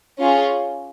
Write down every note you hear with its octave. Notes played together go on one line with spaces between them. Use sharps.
C#4 F4 G#4